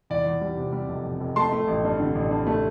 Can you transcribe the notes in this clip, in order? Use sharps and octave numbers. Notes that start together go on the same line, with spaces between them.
E2 D5
E2
G3
C3
G3
F1
F1
F1
A3 A5 C6
A3
A1
G2
D3
A1
G2
A3